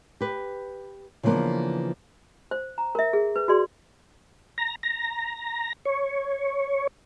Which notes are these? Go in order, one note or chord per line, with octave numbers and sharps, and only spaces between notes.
G4 B4
C#3 E3 F3 A#3 B3 D4
C5
A#5
A#4 E5
G#4
B4
F#4 G#4 D5 C6
A#5
A#5
C#5